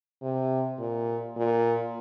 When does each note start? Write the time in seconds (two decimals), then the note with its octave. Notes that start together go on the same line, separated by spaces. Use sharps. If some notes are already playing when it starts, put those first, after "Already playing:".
0.22 C3
0.79 A#2
1.36 A#2